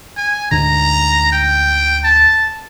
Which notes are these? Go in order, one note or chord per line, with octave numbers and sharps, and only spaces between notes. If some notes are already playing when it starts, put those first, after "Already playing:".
G#5
D2 G#2 D3 A#5
G5
A5